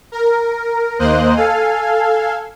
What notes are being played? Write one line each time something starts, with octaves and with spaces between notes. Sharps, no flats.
A#4
D#2 A#3 C5 D#5 F#6
A4 F5 G#5